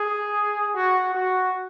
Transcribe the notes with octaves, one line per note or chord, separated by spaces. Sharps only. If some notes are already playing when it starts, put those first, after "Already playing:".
Already playing: G#4
F#4
F#4